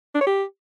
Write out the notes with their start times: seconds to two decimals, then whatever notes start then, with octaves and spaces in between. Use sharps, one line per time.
0.15 D4
0.21 C#5
0.27 G4